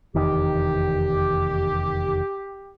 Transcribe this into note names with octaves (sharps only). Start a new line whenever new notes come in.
F1 E2 D#3 G4